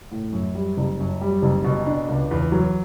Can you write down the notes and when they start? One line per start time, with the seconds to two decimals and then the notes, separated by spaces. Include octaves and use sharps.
0.11 A2
0.33 F#2
0.55 G3
0.77 F#1
0.99 F#2
1.21 G3
1.42 F#1
1.64 B2
1.87 D4
2.09 C#2
2.31 E2
2.52 F#3